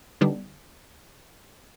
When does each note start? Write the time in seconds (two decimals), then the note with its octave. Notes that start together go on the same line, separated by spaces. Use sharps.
0.21 D3 G3 B3 D4 D#4